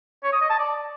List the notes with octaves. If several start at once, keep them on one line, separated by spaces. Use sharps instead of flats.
C#5
D#6
D#5
A5
D5